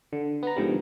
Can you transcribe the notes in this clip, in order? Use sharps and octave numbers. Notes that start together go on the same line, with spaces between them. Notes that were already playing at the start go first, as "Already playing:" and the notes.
D3
B3 A#5
G#2 B2 D3 D#3 F3 G3